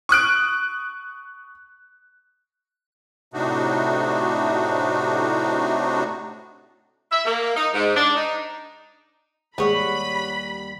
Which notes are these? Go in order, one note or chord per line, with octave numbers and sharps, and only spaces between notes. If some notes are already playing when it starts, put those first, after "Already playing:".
C#6 D#6 F#6 D7
A2 C3 A3 D4 D#4 F#4
E5
A#3
D#4
G#2
D4
D#4
D#2 G#2 G3 G#4 B4 C#5 F#5 B5